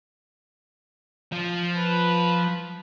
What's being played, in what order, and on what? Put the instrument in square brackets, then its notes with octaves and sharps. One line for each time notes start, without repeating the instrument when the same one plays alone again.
[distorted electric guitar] F3
[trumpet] B4